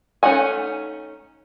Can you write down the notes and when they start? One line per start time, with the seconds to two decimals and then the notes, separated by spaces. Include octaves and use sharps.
0.23 A3 C#4 D#4 F#5 G#5